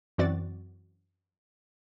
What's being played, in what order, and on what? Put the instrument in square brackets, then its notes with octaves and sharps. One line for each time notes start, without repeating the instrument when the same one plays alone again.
[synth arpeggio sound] F#2 E3 C4 F#4 D5 A6